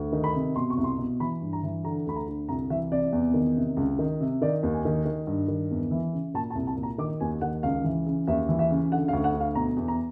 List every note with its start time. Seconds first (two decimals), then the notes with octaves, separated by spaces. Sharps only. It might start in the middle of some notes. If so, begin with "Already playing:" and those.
Already playing: D2
0.12 D#3
0.24 B5
0.35 C3
0.56 B2 C6
0.70 C#6
0.78 C2
0.84 C6
0.98 B2
1.20 E3 B5
1.42 G2
1.53 A#5
1.63 E3
1.84 D3 A#5
2.06 D2 B5
2.16 A#5
2.28 D3
2.49 C2 A#5
2.70 E3 E5
2.91 C3 D5
3.13 E2
3.34 D#3
3.56 C3
3.77 C#2
3.99 D#3
4.21 C3
4.42 D#3 D5
4.63 D#2
4.74 G#5
4.85 D#3
5.05 D#3
5.27 G2
5.48 D#3
5.71 E2
5.91 E3
6.13 C#3
6.34 A#2 A5
6.50 A5
6.55 C2
6.67 A5
6.77 A#2
6.83 A#5
6.98 D#3 D6
7.20 D#2 G#5
7.41 D#3 F#5
7.63 C#2 F5
7.84 E3
8.07 C#3
8.27 D#2 E5
8.49 E3
8.59 E5
8.71 C#3
8.91 D3 F#5
9.08 F5
9.13 D2
9.24 F#5
9.34 D3
9.41 F5
9.55 B2 A#5
9.77 E2
9.88 A#5